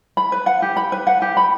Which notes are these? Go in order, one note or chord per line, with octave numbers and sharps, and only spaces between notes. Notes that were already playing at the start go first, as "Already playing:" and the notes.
B5
B4
F#5
G4
B5
B4
F#5
G4
B5